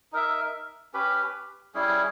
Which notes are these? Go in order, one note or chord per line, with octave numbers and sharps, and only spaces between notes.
D#4 A#4 E5
C#4 G4 B4
G3 C#4 E4 G#4